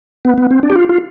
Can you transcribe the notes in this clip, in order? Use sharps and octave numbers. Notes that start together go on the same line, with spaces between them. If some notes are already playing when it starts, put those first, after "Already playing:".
B3
B3
C4
D4
G4
F4
F4